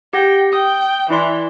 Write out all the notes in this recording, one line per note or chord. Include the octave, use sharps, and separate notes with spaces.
G4 F#5 G5 A#6
G5 D#6
E3 E4 D5 C6